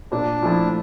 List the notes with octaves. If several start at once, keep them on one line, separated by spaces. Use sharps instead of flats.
A#2 D4
F3 A3 E4